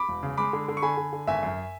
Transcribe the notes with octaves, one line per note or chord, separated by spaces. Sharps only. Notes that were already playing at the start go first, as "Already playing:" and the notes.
Already playing: B5 D6
E1
C#3
G#3 B5 D6
D3
D3
C#6
D3 G#5 B5
D3
D3
G#1 E5 G#5
F#2